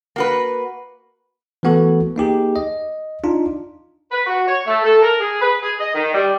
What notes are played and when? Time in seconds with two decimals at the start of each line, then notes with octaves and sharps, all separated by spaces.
0.16 A#3 F#4 B4
1.63 E3 A3 B3 F#4 A4
2.16 A#3 D#4 G4 G#4
2.56 D#5
3.24 D4 D#4 F4
4.12 B4
4.27 F#4
4.48 C#5
4.67 A3
4.84 A4
5.02 A#4
5.21 G#4
5.42 B4
5.63 G#4
5.80 D#5
5.95 D#3
6.14 G3